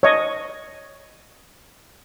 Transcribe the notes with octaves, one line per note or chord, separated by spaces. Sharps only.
C#5 D#5